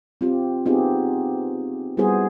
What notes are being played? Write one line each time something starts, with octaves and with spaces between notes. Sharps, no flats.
C4 F4 G4
B3 C4 D#4 F4 G4 G#4
G3 B3 E4 F#4 G#4 C5